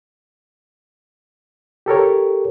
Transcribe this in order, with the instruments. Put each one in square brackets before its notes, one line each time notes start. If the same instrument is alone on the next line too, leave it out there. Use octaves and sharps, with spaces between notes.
[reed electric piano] G4 A4 A#4 C#5